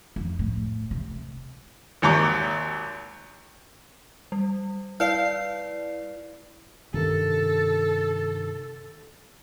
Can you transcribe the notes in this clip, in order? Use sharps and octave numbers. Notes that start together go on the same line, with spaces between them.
F2
A2
C3
G#1 D#2 A#5 D6
G3
E4 B4 D5 F5
G2 C3 D#3 A4